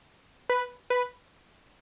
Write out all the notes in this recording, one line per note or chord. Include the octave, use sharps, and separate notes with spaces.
B4
B4